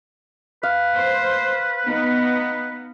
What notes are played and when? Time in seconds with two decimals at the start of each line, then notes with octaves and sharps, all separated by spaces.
0.63 B4 F5
0.95 C5
1.86 B3 D#4